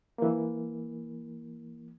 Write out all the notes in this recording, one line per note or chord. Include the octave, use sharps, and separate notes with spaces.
E3 A#3